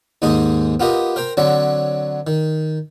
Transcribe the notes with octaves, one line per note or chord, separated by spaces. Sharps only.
D#2 G#2 G#3 D#4 G#4 D#5
B3 F4 G4 A#4 D#5
A#4 C5 G5 A#5
D3 F#3 C4 D4 C#5
D#3